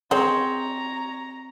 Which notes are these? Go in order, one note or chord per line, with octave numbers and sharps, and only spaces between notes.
C4 G#4 C#5 D#5 G5 A#5